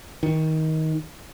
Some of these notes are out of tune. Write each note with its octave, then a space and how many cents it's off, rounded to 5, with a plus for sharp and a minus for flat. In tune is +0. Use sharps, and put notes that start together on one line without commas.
D#3 +20